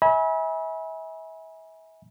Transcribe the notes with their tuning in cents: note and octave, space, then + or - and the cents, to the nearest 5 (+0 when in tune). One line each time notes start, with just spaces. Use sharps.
E5 -35 G#5 +0 B5 -35